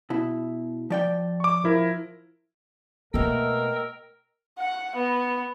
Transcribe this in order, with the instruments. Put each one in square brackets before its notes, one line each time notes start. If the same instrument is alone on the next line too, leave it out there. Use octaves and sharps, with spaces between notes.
[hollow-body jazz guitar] B2 E4
F3 D5 G5
[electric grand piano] C#6 D6
F3 E4 A#4
[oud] B2 A3 [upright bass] A#3 [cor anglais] A#4 [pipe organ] D#5 G5 E6
[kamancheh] F#5
B3